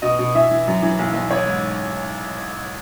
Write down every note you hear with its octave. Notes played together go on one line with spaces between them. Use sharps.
B2 D#5
B2
E3 E5
E3
F#2
E3
B1
B1
A1 C#5
G#2